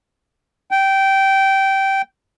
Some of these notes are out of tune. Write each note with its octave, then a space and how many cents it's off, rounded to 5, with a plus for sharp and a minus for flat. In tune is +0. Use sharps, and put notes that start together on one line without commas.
G5 -15